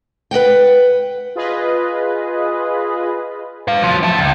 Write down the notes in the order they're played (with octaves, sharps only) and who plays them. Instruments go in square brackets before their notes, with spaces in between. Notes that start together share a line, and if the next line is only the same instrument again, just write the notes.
[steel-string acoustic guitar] B4 D#5 F#5 G5
[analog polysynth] F4 G#4 B4 D#5
[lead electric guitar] B4 F5
F3 F#3
E4 A4
C#2